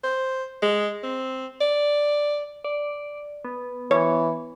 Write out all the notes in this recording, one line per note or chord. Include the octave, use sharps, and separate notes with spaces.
C5
G#3
C4
D5
D5
B3
E3 C#5